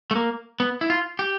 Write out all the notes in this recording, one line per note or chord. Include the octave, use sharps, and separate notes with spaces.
A3
A#3
B3
E4
F4
G4